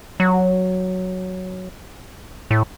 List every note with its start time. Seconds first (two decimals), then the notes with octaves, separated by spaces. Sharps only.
0.20 F#3
2.51 A2